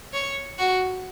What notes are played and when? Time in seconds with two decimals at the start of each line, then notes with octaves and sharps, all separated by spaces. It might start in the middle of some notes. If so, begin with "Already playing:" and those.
0.13 C#5
0.58 F#4